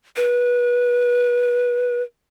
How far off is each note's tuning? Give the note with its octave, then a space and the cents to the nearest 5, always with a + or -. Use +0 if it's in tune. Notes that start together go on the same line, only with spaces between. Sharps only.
B4 -25